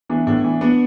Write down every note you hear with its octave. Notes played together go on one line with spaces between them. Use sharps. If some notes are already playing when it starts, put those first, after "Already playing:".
E3 B3 D4
A2 B3 D4
E3
B3 D4